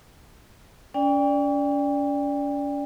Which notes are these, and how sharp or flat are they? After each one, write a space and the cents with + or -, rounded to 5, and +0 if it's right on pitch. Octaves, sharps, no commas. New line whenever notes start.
C#4 +40 D5 +0 G5 +30